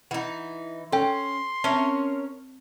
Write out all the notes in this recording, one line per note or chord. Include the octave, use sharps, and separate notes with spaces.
E3 D#4 F#5
C#4 A4 G5 C6
C4 C#4 A#4 C#5 E5 A5